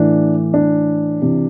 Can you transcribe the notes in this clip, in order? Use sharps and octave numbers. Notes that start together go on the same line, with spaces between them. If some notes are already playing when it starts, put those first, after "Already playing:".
Already playing: A2 E3 D4
D4
C3 E3